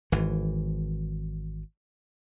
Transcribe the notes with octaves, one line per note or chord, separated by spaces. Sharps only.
G#1 E3